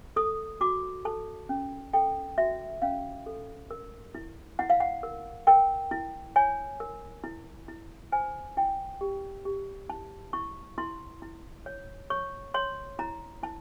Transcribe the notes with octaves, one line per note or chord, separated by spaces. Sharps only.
A4 D#6
F#4 D6
A4 A5
C#4
A4 G5
F#4 E5
C#4 F5
A4
A#4
E4
E4 F#5
F5
F#5
A#4
A#4 G5
E4
C#5 G#5
A#4
E4
E4
C5 G#5
E4 G5
G4
G4
E4 A5
E4 C#6
E4 C6
E4
C#5
C#5 C#6
C#5 C6
E4 A#5
E4 A5